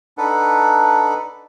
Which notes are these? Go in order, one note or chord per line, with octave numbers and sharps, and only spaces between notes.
D4 D#4 A4 B4 F#5